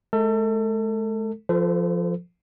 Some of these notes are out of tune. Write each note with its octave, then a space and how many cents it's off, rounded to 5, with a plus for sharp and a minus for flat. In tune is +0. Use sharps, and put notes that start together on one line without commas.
G#3 +45 A4 +35
F3 +0 A4 +0 C5 -45